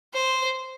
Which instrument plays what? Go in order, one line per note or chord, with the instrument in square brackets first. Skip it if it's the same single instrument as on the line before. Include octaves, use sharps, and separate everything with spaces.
[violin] C5